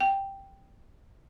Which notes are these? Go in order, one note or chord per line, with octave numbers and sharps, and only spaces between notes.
G5